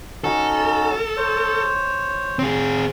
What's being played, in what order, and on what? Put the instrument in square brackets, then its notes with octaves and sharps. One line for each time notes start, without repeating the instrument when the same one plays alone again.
[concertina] C#4 D#4 F#4 [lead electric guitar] A4
[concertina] C5 C#5
[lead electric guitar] C4 G#4